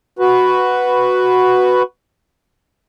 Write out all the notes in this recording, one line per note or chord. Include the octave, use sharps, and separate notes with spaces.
F#4 B4